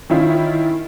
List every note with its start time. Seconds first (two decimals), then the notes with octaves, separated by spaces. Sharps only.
0.10 D#3 C#4 E4 F4